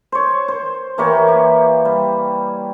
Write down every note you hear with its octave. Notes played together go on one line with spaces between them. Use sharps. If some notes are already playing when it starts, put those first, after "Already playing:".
C5 C#5
C5
E3 A#3 G4 C#5
G4
G3